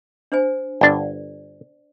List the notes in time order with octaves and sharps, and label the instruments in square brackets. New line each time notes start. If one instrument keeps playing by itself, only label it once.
[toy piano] D4 C5 G#5
[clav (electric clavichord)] G1 D4 [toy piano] D5